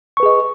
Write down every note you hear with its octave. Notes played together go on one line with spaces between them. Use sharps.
G#4 B4 D#5 C#6